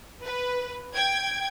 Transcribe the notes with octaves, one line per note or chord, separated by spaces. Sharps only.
B4
G5 G#6